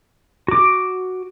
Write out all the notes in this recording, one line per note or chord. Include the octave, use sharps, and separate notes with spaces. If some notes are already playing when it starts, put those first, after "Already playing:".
F#4 D6